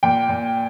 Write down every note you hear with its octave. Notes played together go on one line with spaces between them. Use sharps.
A#2 G5
A#2